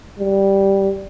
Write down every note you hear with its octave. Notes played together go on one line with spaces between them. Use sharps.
G3